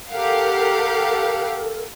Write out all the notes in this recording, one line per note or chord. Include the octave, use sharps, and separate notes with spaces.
G4 A4 A#4 F5 F#5